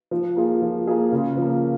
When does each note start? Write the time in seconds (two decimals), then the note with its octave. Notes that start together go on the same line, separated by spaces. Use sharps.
0.11 F3
0.36 A#3 F4 G#4
0.62 F3
0.87 A#3 F4 G#4
1.12 C#3
1.37 F3
1.42 A#3